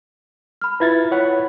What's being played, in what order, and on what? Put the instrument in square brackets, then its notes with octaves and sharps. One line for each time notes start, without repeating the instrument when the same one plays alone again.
[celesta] B5 F6
[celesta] E4 F4 E5 [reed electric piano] B4 G#6 A6
[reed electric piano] C#5 F#5 B5